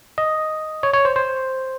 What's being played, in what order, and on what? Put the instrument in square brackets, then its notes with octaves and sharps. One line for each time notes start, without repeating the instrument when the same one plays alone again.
[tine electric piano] D#5
C#5
C#5
C5
C5